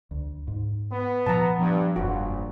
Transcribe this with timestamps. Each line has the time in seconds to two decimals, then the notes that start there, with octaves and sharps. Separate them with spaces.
0.11 D2
0.47 G#2
0.91 B3
1.26 A#2 F3 A5 A#5
1.59 G2 F3
1.96 F1 A#1 G2 F#4